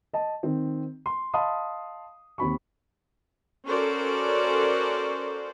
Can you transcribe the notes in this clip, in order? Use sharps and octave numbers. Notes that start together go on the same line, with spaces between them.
D#5 A5
D#3 C4
C6
D#5 F5 A5 B5 C6 D#6
D#2 C4 B5 C#6
C#4 F#4 A4 A#4 C5 D5